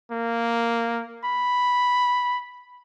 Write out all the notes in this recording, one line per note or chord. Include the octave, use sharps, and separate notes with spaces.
A#3
B5